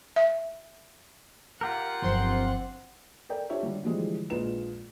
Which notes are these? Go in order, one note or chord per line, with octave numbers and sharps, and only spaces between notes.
E5
F4 G4 A#4 F#5
G1 G2 F3 F#3 C4 C6
A4 A#4 D5 G5
D4 F4 G4 C#5 E5
D3 G3
D3 E3 F3 G3 G#3
A#1 A#2 G#3 F4 B4 E7